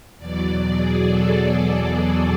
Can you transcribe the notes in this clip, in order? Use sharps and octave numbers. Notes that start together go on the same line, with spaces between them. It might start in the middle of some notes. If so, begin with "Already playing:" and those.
E2 B2 F#3 D5
D5
G#4
A4
G#4